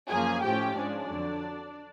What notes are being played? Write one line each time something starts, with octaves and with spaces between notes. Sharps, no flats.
F#2 C#3 F3 A#3 G#4 G#5
A2 F3 A3 C#4 G4 G5
G#2 F3 G#3 C#4 D4 D5
F2 D3 F#3